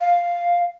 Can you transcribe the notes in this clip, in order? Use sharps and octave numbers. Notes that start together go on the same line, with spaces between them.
F5